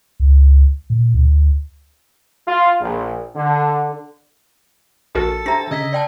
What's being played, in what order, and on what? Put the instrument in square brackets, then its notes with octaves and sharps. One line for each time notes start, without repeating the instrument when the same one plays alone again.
[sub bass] C#2
A#2
D2
[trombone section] F4
A#1
D3
[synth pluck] A#1 F#4 A#4 [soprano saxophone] A4
[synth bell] D4 A#5 [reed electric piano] G4 C5 E5 [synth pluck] A#6
[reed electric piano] C#3 [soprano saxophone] D#5 [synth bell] E6 G#6 B6
[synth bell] D5 G5 A5